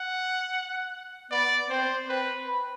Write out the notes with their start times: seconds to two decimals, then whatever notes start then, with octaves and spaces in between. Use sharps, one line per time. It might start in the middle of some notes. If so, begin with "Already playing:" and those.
Already playing: F#5
1.31 B3 D5
1.70 C4 C5
2.09 C4 B4
2.47 B4